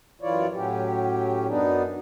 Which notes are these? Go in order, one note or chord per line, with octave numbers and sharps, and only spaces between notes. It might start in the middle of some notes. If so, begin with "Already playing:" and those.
F#2 E3 E4 F4 C#5 D5
A2 F#3 C#4 G4
F#2 B3 D4 D#4